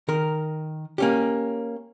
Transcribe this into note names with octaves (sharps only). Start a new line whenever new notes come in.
D#3 A#4
A#3 C#4 G4